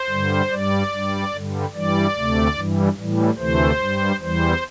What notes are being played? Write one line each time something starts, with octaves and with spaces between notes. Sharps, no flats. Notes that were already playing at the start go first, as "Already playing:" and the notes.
Already playing: C5
G2 D3 G3
G2 G3 D5
G2 G3
G2 D3 G3
G2 E3 G3 D5
D2 C3 A3
G2 E3 G3
A2 E3 G3
D2 C3 E3 A3 C5
G2 G3
E2 E3 G3 C5